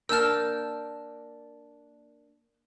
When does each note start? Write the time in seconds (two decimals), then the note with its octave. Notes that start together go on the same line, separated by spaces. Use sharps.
0.09 A#3 D4 A#4 A5 E6 F6 G6